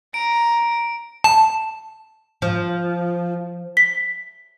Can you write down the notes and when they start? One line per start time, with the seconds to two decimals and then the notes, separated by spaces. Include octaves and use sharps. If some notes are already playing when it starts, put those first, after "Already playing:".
0.14 A#5 D7
1.24 A5
2.42 F3
3.77 B6